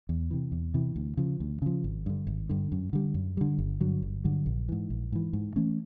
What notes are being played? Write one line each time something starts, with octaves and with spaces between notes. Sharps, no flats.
E2
C3 E3
E2
C3 E3
D2
C#3 F3
D2
C#3 F3
G#1
G2 D3
G#1
G2 D3
F#2
D3 G3
F#2
D3 G3
G1
G2 D3 F#3
G1
G2 D3 F#3
A#1
G#2 E3
A#1
G#2 E3
G#2
E3 A3 C#4